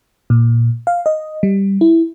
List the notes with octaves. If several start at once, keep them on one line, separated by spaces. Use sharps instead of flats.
A#2
F5
D#5
G3
E4